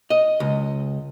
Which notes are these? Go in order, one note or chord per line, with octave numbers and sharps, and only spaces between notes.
D#5
C#2